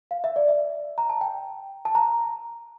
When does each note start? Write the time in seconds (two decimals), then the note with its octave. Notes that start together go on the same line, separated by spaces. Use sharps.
0.11 F5
0.24 E5
0.36 D5
0.48 E5
0.98 A#5
1.09 A5
1.21 G5
1.85 A5
1.95 A#5